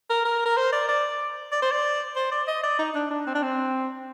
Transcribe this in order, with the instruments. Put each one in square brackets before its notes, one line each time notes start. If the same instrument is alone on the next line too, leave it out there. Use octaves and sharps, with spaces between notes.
[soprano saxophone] A#4
A#4
A#4
C5
D5
D5
D5
C5
D5
C5
D5
D#5
D5
D#4
D4
D4
C4
D4
C4